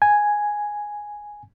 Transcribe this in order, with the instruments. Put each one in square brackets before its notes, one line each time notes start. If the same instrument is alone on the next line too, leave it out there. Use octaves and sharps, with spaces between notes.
[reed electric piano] G#5